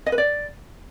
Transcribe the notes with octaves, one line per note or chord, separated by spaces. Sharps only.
D#5
B4
D5